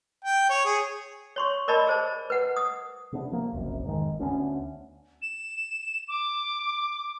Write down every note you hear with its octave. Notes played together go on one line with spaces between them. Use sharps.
G5
C#5
G#4
C#5 C6 C#6
A#4 D5 D#5 A5 B5
G#4 C5 A5
B4 F#5
D#6
C3 B3 D4
F3 A#3
F#1 C2 F#2
F1 G#2 D#3
D2 B3 C#4 D4
E7
D6